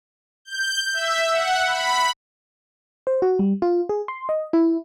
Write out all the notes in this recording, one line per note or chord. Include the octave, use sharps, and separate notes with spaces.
G6
E5
F#5
B5
C5
F#4
G3
F4
G#4
C6
D#5
E4